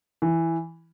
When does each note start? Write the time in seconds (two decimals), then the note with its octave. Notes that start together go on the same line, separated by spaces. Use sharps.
0.22 E3